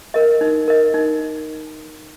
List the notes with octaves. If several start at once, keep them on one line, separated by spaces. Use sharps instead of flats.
A#4 D#5
D#4
A#4 D#5
D#4